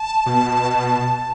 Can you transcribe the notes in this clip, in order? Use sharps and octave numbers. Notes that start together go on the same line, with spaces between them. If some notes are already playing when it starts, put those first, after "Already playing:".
Already playing: A5
B2